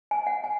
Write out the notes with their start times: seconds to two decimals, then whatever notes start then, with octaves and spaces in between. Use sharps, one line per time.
0.11 G#5
0.27 F#5
0.44 G#5